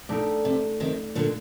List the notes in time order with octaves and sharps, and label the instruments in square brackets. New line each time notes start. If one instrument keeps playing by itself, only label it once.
[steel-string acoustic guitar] A#2 [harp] A3 D#4 G4 A#4 D5
[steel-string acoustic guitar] C3
C3 D#3
A#2 D3